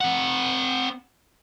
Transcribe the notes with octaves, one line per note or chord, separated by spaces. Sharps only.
C4 F#5